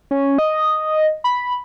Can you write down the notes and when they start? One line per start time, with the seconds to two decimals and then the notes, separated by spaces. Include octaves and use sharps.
0.11 C#4
0.38 D#5
1.24 B5